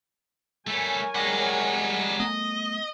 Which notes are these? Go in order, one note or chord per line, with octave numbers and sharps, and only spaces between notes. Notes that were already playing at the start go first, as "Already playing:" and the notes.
G3 A3 A#4 C#5 G#5
G3 G#3 F#5 A#5
A3 B3 D#5